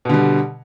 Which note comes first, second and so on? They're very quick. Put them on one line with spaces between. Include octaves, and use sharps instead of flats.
B2 D3 G3